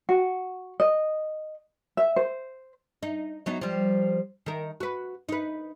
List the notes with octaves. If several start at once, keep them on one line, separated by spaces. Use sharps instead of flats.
F#4
D#5
E5
C5
D#4
F#3 B3 D#4
F3 G3
D#3 A#4
F#4 B4
D#4 B4